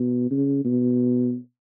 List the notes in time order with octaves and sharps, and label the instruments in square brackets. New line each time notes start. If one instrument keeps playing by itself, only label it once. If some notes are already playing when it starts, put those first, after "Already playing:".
Already playing: [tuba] B2
C#3
B2